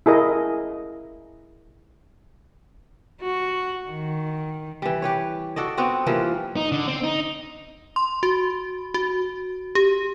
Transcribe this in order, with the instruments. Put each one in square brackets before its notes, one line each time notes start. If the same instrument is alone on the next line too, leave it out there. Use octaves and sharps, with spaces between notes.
[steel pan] E4 G#4 A#4 D#5
[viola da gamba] F#4
D#3
[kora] E3 G3
G4 B4 C#5
F#4 A4 D5 D#5
B3 C4 D4 F#4
E3 F3 G3 A#3
[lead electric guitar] D#4
D3
C4
D#4
[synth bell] C6
F#4
F#4
G4